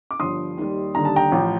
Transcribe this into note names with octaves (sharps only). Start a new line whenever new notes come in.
D6
G1 G2 F3 C6 D#6
D#2 D#3 G3
D#2 D3 G3 A#5
A5
G5 A#5
A1 A2 F3